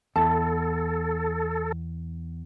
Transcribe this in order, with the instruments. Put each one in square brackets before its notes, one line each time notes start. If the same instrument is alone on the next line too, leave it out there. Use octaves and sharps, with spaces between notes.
[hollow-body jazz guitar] E2 [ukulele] E4 A5 [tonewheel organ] A4